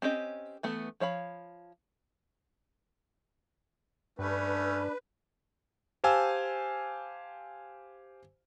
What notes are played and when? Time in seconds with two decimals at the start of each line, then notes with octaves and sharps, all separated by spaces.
0.02 C4 C#4 G4 D#5
0.63 E3 A3 B3
1.00 F3 C#5 F5 B5
4.19 G2 A3 C#4 D4 B4
6.04 G4 C5 F5 G#5 A5 E6